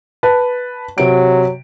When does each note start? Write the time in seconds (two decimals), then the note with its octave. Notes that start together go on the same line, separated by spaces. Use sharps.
0.23 B4 A5
0.98 C3 F#3 D7